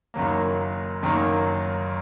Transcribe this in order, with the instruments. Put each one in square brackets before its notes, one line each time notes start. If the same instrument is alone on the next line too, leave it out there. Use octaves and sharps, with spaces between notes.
[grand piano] F#1 F#2 D#3 F#3 A#3
F#1 F#2 D#3 F#3 A#3